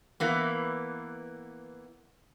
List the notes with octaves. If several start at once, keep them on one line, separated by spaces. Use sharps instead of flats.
E3 A#3 B3